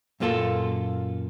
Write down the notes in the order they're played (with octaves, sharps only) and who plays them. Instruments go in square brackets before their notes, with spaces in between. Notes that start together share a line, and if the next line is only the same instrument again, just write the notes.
[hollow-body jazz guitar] F#2 A#2 A#3 F4 A4